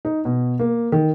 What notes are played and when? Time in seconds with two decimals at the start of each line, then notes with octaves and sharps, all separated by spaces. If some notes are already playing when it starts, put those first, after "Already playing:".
0.05 D#4
0.25 B2
0.59 A#3
0.92 D#3